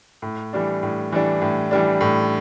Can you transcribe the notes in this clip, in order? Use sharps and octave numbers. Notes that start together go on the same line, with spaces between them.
A2
E3 G3 D4
A2
E3 G3 D4
A2
E3 G3 D4
A2